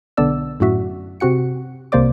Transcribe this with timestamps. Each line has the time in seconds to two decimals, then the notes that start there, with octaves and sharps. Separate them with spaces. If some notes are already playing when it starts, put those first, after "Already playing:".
0.17 B1 D3 B3 D4 D5 E6
0.60 F#2 A2 F#4 E5
1.20 C3 C4 F#4 F#5 C#7
1.92 C2 C3 A#3 C5 D5 D6